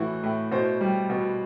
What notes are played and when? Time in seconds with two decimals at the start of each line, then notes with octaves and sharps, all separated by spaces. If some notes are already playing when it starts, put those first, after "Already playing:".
Already playing: A2 E3 F#4
0.24 A2
0.51 B2 C5
0.81 G3
1.10 B2